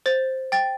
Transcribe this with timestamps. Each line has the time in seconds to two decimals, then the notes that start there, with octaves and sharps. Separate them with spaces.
0.06 C5 A6
0.52 G5 A6